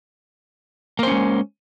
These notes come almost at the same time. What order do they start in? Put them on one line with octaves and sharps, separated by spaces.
A#3 C5 C#4 G#3